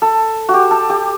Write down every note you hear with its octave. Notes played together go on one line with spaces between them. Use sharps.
A4
F#4
G4
A4
G4